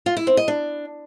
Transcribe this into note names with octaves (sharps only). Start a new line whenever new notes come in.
F4
E4
C4
D#5
D4